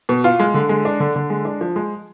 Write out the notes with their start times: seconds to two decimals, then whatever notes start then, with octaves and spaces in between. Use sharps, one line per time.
0.09 B2
0.24 F4
0.40 G#3
0.54 D3
0.69 G#3
0.85 D4
1.00 D3
1.16 D3
1.30 G#3
1.45 D4
1.61 F3
1.76 G#3